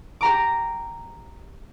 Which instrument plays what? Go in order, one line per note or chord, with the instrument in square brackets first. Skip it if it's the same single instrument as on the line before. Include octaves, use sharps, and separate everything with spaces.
[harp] G4 A#5 D6